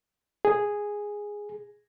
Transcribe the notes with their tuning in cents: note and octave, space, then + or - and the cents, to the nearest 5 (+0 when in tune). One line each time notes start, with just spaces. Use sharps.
G#4 -5